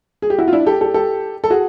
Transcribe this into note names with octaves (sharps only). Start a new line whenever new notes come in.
G#4
G4
E4 F#4
F4
D4 E4
G4 A4
G4 A4
G4 A4
A4
F#4 G#4